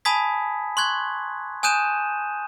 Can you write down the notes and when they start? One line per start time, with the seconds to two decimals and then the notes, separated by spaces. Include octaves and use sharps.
0.05 G#5 A5 B5 D#6 G#6 B6
0.77 C6 C#6 F#6 G#6
1.63 G#5 D#6 F#6 G6 D#7 E7